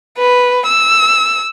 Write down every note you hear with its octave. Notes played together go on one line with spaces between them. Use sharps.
B4
E6